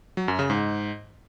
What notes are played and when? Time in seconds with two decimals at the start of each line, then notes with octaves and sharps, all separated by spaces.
0.17 F#3
0.28 F#2
0.39 C#3
0.50 G#2